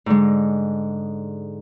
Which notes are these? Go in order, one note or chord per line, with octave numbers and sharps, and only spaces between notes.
G#2 D3 G#3